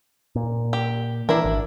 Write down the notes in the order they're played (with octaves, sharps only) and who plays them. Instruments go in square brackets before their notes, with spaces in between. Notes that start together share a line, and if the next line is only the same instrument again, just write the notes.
[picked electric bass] A#2
[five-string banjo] G4
[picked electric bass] E3 [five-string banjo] D4 E4 A#4
[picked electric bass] G#1